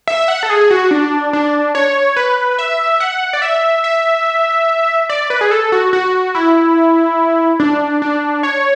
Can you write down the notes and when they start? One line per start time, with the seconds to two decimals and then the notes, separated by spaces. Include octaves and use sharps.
0.08 E5
0.28 F#5
0.43 A4
0.50 G#4
0.70 F#4
0.91 D4
1.33 D4
1.75 C#5
2.16 B4
2.59 E5
3.00 F#5
3.33 D5
3.42 E5
3.84 E5
5.10 D5
5.30 B4
5.41 G#4
5.51 A4
5.72 F#4
5.93 F#4
6.35 E4
7.60 D4
8.02 D4
8.43 C#5